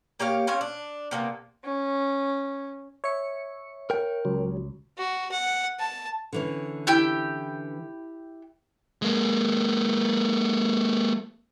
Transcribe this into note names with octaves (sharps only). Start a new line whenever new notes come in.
A#3 G4 C#5 F5
C4 C#4 C#5 F5
D4
C3 A#3 B3
C#4
C#5 E5 C#7
A#4 G5
C#2 F#3
F#4
F#5
A5
D3 E3 C#4
E4 G4 G5
G#3 A#3